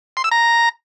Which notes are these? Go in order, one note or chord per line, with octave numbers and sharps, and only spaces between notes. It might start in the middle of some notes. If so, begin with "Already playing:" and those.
C6
E6
A#5